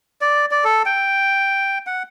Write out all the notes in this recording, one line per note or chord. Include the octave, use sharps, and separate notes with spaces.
D5
D5
A4
G5
F#5